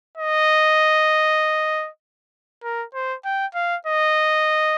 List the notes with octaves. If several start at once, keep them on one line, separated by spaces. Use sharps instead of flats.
D#5
A#4
C5
G5
F5
D#5